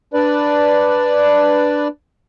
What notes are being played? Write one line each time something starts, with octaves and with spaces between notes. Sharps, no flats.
D4 B4 D5